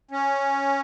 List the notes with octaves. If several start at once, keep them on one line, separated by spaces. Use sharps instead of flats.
C#4